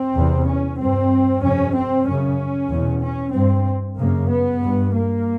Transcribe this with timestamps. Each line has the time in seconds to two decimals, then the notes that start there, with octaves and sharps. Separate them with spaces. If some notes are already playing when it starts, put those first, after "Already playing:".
Already playing: C4
0.16 E2 C3
0.48 C#4
0.79 G2 C4
1.43 F2 C3 C#4
1.76 C4
2.07 F#2 C#3 C#4
2.71 E2 B2
3.02 C#4
3.34 G2 C4
3.98 F#2 C#3 A#3
4.31 B3
4.62 G2
4.94 A#3